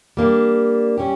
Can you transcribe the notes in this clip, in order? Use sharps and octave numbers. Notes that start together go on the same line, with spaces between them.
G3 A#3 D4
G3 C#4 G4